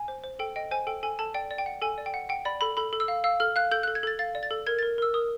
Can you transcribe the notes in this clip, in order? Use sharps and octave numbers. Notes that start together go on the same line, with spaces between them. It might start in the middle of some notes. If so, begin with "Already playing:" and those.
Already playing: G#5
C5
C5
A4 G5
D#5 G5
C5 G#5
A4 G5
A4 G#5
A4 A5
D5 G5
D5
G5
F#5
A4 G#5
D5
G5
F#5
F#5 G5
D5 B5
A4 B5
A4 B5
A4
E6
F5
F5 E6
A4 F6
F5 F#6
A4 G6
F#6
A4
G#6
A4 A6
F5 A6
D5
A6
A4
A#4 G#6
A6
A#4
A#4 E6
A#4 D#6